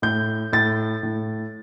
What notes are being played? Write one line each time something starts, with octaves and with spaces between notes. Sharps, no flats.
A2 G6
A2 A6
A2